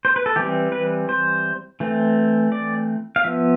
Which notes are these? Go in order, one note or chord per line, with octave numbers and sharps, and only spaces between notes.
C5
B4
A4
E3 G3 C4 G4
B4
C5
E3 A3 C4
D5
F5
F3 B3 E5